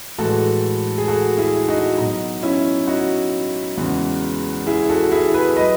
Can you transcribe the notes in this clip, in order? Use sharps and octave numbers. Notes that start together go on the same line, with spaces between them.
A2 E3 G#3 F#4 A4
G#4
F#4 A4
E4 G#4
D#4 F#4
B2 F#3 D#4
C#4 E4
D#4 F#4
E2 C#3 E3 G#3
E4 G#4
F#4 A4
E4 G#4
G#4 B4
F#3 B4 D#5